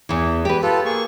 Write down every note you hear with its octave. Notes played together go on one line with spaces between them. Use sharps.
E2 E3
G4 B4
F4 G4 A4 B4
A#3 G#4 C#6